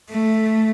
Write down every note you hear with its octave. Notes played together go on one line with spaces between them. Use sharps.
A3